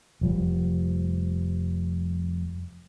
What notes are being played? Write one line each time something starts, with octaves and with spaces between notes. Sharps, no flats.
F1 F3 G3